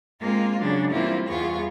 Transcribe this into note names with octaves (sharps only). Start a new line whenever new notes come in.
G#3 A#3 C4 F4
C#3 F#3 D4
E3 G3 A#3 C4 E4 F4
E2 G3 B3 F4 G#4 C#6